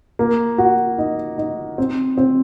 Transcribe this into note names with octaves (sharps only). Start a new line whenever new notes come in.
A#3
F#4
D#4
D#4
C4
C4